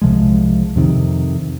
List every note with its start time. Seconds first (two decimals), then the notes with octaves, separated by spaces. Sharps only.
0.01 C2 C3 F3 G#3
0.76 F2 C3 D#3